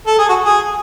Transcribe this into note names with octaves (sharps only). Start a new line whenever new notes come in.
A4
G#4
F#4
G#4